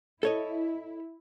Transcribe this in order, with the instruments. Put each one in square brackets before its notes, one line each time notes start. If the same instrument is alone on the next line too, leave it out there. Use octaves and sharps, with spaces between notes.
[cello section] E4 [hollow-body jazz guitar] A4 C#5 D#5